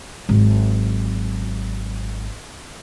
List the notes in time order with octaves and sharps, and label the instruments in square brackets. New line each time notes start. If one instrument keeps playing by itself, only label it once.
[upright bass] G#1 F#3